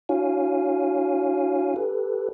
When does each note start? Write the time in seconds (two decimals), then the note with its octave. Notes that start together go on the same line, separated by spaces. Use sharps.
0.09 D4 E4 F#4 C#5 F5 G#5
1.76 G4 A4 B4